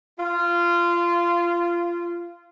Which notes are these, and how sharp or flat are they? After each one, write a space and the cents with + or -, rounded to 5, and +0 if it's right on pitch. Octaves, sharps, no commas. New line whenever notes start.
F4 -20